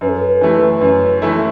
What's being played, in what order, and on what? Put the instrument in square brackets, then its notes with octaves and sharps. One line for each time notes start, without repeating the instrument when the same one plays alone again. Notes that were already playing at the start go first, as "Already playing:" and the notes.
[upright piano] F#2 [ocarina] B4
[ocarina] A4
B4
[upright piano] E3 A3 E4
F#2
E3 A3 E4